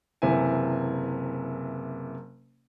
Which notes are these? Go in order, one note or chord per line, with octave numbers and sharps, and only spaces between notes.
F#1 C3 E3 E5 G#5